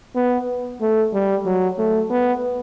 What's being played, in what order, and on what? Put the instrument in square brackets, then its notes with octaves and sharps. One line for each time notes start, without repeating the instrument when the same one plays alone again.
[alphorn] B3
A3
G3
F#3
A3
B3